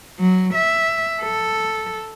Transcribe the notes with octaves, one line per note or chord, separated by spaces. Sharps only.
F#3
E5
A4